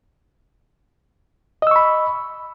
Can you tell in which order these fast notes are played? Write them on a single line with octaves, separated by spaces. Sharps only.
D#5 E6 C#6 B5